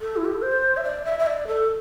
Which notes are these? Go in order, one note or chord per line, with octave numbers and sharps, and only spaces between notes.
A4
E4
G4
A4
C5
E5
D5
E5
E5
D5
A4